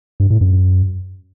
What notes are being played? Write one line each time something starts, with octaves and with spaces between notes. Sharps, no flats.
G2
A2
F#2